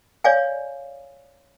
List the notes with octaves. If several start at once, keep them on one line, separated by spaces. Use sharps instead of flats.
C#5 D5 F5 G#5